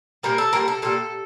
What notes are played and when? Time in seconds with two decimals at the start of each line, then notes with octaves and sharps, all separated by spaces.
0.23 A#2 G3 A#3 A#4
0.38 A4
0.53 A#2 G3 A#3 A#4
0.68 A4
0.82 A#2 G3 A#3 A4